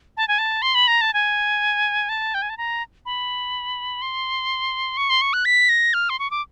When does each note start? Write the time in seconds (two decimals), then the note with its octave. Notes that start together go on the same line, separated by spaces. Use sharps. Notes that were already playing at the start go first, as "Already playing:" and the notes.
0.17 A5
0.28 G#5
0.39 A5
0.62 C6
0.75 B5
0.88 A#5
1.01 A5
1.14 G#5
2.09 A5
2.34 G5
2.42 G#5
2.50 A5
2.58 A#5
3.06 B5
4.02 C6
4.97 C#6
5.10 C6
5.22 C#6
5.33 F#6
5.45 B6
5.69 A#6
5.94 F6
6.10 C6
6.19 C#6
6.31 D6